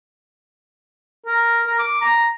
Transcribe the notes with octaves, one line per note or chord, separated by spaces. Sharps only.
A#4
A#4
D6
A#5